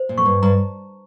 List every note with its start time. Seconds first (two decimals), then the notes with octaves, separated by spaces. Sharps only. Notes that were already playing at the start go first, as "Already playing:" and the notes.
Already playing: C5
0.09 A#2
0.17 F2 C#6
0.26 G2
0.42 G2 A#5